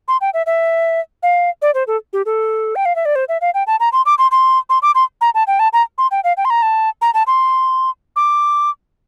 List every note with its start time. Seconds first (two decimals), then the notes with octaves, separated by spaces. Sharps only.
0.08 C6
0.21 G5
0.34 E5
0.46 E5
1.23 F5
1.62 D5
1.74 C5
1.87 A4
2.13 G4
2.26 A4
2.76 G5
2.85 F5
2.96 E5
3.05 D5
3.15 C5
3.29 E5
3.41 F5
3.54 G5
3.67 A5
3.80 A#5
3.93 C6
4.06 D6
4.18 C6
4.31 C6
4.70 C6
4.82 D6
4.95 C6
5.21 A#5
5.34 A5
5.47 G5
5.59 A5
5.73 A#5
5.98 C6
6.11 G5
6.24 F5
6.37 G5
6.45 C6
6.50 A#5
6.62 A5
7.02 A#5
7.14 A5
7.27 C6
8.16 D6